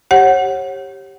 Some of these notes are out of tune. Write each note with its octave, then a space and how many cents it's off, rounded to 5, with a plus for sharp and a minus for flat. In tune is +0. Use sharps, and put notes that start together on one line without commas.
G4 +0 C#5 -30 F#5 +0